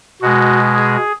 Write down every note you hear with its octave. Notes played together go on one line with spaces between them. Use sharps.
B2 G#3 F#4
G#4